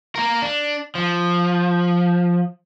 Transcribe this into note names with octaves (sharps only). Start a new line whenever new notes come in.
A#3 A#4
D4
F3